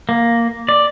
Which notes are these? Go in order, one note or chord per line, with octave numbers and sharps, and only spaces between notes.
A#3
D5